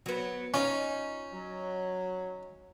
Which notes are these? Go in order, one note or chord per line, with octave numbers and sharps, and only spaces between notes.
F#3 B3
C#4 D#4 F4
F#3